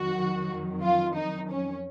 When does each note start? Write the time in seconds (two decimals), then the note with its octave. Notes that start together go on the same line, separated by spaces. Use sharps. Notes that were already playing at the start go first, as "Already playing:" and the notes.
Already playing: F2 D#3 F#3 F#4
0.83 F4
1.16 D#4
1.50 C#4